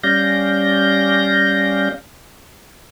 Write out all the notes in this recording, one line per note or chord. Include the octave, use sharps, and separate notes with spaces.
G3 C#4 D5 F5 G6 A#6